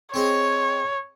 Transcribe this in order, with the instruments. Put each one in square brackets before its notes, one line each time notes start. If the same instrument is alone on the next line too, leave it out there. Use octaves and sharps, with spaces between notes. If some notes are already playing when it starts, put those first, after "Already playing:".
[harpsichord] C4 G#4 D#5 [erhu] C#5